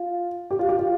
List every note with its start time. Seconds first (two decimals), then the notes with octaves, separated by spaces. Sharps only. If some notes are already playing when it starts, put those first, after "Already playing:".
Already playing: F4
0.51 G4
0.59 F4
0.69 G4
0.79 F4